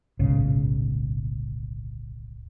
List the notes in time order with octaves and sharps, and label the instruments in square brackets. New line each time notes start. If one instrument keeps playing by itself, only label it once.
[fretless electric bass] D1 B1 G#2 C#3